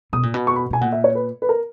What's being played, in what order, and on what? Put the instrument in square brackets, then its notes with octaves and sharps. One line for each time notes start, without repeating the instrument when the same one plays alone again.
[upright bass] B2 [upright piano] D#6
[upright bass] A#2
B2
[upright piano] C#6
B5
[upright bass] B2 [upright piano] G#5
[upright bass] A#2 [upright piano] F#5
[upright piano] E5
C#5
B4
B4
A#4